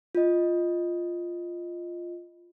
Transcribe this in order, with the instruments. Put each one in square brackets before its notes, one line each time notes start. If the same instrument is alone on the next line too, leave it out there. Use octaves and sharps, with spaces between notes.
[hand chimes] F4 D#5